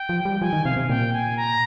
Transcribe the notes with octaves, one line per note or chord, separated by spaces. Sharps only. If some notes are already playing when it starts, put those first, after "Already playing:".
Already playing: G5
F3
G3
F3 G#5
D#3
C3 F5
C3
A#2 G5
G#5
A#5